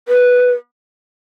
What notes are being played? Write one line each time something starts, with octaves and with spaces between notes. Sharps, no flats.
B4